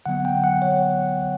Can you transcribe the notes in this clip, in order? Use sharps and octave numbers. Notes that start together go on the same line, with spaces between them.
D3 F#3 B3 F#5
G5
F#5
C#5